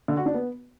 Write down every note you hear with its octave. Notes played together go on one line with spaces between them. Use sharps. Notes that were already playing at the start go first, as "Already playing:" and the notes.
D3
F#4
D4
B3